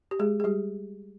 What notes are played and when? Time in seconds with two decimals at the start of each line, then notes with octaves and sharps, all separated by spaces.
0.11 G4
0.19 G#3 G#4
0.40 G#4
0.44 G3 G4